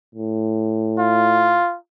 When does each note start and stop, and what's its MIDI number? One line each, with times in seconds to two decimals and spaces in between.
0.15 1.62 45
0.99 1.76 65